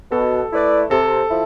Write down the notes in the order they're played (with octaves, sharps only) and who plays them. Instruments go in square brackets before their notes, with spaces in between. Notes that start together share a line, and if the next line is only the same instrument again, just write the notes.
[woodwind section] B2 [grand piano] A4
[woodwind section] A3 E4 B4 D5
[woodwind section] C3 [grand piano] A4
[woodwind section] F3 E4